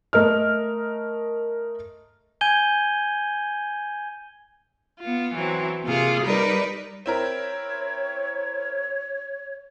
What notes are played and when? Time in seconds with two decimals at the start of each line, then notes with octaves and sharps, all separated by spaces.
0.13 A3 A#4 D#5 F6
2.41 G#5 G6 G#6 D#7 G7
4.99 B3 F4
5.34 E3 F#3 C4
5.84 C3 A#3 F4 G#4
6.23 G3 D#4 A#4 B4 D5
7.06 C4 E4 A#4 C#5